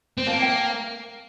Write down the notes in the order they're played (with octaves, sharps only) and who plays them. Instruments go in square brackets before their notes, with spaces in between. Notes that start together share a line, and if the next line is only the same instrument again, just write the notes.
[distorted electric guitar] C4
[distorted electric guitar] A#3 [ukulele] F5 A5
[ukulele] E5 G5
F5